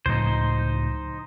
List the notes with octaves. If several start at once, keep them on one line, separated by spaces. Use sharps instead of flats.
C#2 A2 F3 D#4 C5